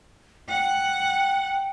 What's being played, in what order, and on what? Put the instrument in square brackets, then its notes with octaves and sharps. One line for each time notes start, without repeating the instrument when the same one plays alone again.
[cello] F#5 [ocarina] G5